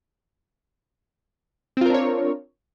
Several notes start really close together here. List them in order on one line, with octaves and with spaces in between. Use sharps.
C4 F4 A#4 D4 C#5